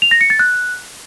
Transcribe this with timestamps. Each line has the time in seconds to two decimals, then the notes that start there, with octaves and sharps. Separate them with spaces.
0.02 F7
0.11 A#6
0.21 C#7
0.30 A6
0.39 F#6